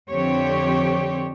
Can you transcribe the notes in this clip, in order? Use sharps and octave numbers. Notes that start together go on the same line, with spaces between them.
F2 D3 C4 G4 C#5